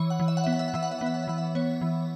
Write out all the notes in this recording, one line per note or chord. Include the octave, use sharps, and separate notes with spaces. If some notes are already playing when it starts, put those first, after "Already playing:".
Already playing: E3 C#5
F#5
E3
E5
F#5
E5
B3
F#5
E5
F#5
E3 E5
F#5
E5
B3 F#5
E5
F#5
E5
E3 F#5
E5
B3 C#5
E3